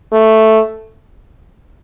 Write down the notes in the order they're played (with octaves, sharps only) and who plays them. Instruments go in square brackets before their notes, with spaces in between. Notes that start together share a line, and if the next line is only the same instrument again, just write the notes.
[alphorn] A3